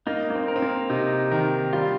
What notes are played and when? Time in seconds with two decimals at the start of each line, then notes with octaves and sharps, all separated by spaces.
0.07 A#3 D#4
0.30 A#3
0.35 C4
0.48 A#4
0.56 C4
0.62 A#3
0.90 C3 D#4
1.31 D#3 A#4
1.73 G3 F4